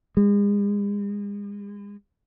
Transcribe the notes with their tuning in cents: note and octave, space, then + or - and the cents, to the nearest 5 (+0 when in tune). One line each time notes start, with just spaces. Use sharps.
G#3 -40